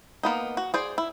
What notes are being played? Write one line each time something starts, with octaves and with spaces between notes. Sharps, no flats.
A#3 B3 D#4
F#4
G#4 C5 D5
E4